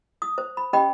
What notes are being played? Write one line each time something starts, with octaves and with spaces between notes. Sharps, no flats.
D#6
C5
B5
C#4 G4 C5 D#5 G5 B5